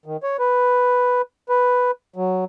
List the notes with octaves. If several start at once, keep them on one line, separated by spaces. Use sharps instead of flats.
D#3
C#5
B4
B4
F#3